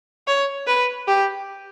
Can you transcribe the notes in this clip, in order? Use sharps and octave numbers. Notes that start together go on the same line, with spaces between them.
C#5
B4
G4